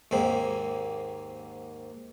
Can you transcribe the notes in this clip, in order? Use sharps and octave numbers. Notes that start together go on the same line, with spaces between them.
D#2 G#2 A#3 C4